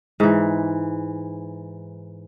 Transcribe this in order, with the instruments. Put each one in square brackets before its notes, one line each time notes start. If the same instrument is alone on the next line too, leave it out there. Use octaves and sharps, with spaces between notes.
[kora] G#2 E3